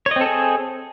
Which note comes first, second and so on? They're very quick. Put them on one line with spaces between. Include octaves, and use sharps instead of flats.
C#5 D#5 C4 A4 G#4